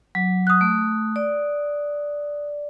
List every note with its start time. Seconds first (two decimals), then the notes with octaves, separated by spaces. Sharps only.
0.15 F#3
0.47 D#6 F#6
0.61 A3
1.16 D5